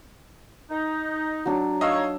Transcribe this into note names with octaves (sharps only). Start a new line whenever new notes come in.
D#4
F#3 D4
D#4 C#5 D#5 F5 E6